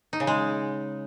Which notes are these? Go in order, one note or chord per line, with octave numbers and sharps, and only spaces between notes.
D#4
C#3
G#3